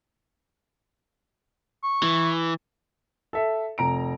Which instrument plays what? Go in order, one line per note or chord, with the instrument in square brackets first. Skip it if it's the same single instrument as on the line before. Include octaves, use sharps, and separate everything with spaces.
[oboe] C#6
[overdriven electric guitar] E3
[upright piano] A4 E5
F1 A#5 D7